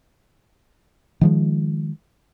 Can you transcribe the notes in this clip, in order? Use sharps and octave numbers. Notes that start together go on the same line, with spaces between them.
D#3 F3 G#3